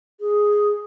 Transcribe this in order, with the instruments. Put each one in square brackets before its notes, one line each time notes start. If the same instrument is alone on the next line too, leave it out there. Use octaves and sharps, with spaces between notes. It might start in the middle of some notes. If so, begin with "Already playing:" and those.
[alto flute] G#4